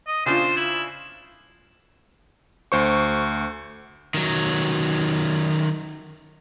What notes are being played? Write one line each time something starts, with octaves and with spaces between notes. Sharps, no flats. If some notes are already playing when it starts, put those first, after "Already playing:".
D#5
C#3 D4 F4 C5
E4
D2 C5 C#6
D#3 F#3